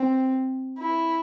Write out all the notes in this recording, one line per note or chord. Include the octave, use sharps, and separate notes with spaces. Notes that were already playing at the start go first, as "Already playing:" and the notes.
Already playing: C4
E4